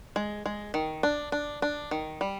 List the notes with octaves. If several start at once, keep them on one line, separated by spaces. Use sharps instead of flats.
G#3
G#3
D#3
D4
D4
D4
D#3
G3